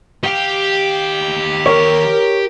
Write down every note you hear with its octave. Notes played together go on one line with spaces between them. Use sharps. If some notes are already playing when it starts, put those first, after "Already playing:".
D#3 G4 F5
A#4 C#5